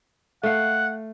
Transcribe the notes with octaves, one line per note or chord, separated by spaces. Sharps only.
A3 F5 F#5